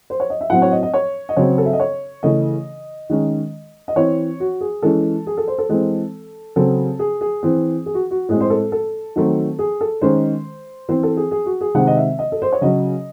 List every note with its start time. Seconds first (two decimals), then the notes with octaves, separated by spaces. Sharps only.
0.10 C5
0.20 C#5
0.30 D#5
0.41 E5
0.50 A2 F#3 C4 F#5
0.62 C#5
0.72 D#5
0.83 D#5
0.94 C#5
1.29 D#5
1.37 C#3 F#3 C4 C#5
1.58 A4
1.66 E5
1.73 D#5
1.80 C#5
2.23 C#3 E3 A3 D#5
3.10 D#3 G#3 C#4
3.88 D#5
3.96 E3 C4 C#5
4.40 F#4
4.61 G#4
4.82 E3 G#3 C#4 A4
5.27 G#4
5.37 A4
5.47 C5
5.58 A4
5.69 E3 G#3 C4
6.56 C#3 F#3 C4 A4
6.99 G#4
7.21 G#4
7.43 E3 C4
7.86 G#4
7.94 F#4
8.11 F#4
8.29 A2 G#3 C4 G#4
8.40 C5
8.50 A4
8.72 A4
9.16 D#3 F#3 A3 C4
9.59 G#4
9.81 A4
10.01 D#3 G#3 C#4 C5
10.89 E3 C4 C5
11.03 A4
11.17 G#4
11.31 G#4
11.46 F#4
11.61 G#4
11.75 C3 D#3 G#3 C4 F#5
11.87 D#5
11.97 E5
12.19 D#5
12.32 A4
12.42 C5
12.52 C#5
12.61 C#3 F#3 C#4 D#5